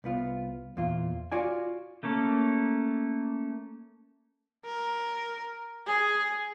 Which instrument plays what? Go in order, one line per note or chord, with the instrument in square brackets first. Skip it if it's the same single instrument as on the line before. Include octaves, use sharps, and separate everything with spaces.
[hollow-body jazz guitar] C2 B3 F4
E2 A#2 F4
F4 F#4 D5 G#5
[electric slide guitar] A3 A#3 C#4 A4
[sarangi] A#4
G#4